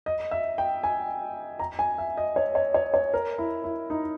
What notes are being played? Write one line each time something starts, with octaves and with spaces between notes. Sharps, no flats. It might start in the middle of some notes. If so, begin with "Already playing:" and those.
D#5
E5
G5
G#5
A#5
G#5
E5
D#5
C#5
C#5
C#5
C#5
A#4
E4
E4
D#4